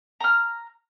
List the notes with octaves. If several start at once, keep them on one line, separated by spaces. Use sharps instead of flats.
A#5 F6